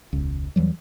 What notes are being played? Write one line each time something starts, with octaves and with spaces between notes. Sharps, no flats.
E1 C#2
E2 E3 F#3 G3